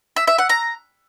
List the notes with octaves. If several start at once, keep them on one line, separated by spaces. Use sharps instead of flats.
E5
E5
F#5
A#5